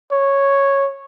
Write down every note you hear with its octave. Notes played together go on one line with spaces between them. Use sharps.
C#5